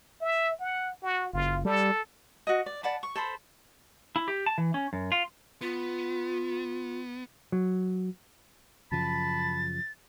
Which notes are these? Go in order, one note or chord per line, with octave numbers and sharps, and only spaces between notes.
E5
F#5
F#4
F#1 F4
G3 A4
F#4 D#5
D5
D5 F#5 A5 B5
C#6
A4 C5 B5
E4
G4
A5
E3
C#4
F#2
F4
B3 F4
F#3
F#2 C#3 F3 A5 B5 A6